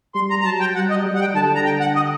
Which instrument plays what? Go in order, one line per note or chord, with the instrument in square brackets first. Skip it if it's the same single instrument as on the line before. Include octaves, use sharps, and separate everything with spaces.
[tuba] G3 [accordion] C6
[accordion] A#5
A#5
[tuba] F#3 [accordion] A5
[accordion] G5
[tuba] G3 [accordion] F#5
[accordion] D#5
[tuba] G3
[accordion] F#5
G5
[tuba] D3 [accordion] A5
[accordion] A#5
G5
F#5
D#5